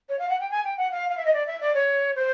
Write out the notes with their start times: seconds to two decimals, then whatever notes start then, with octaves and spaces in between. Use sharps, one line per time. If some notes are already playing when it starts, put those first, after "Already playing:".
0.09 C#5
0.19 F5
0.29 F#5
0.40 G5
0.51 G#5
0.64 G5
0.77 F#5
0.92 F5
1.10 F5
1.17 E5
1.25 D#5
1.33 D5
1.47 E5
1.61 D5
1.74 C#5
2.16 C5